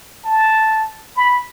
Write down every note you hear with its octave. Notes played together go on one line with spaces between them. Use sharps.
A5
B5